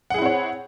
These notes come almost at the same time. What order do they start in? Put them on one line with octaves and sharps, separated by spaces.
F#5 G#4 E4 C4 C#5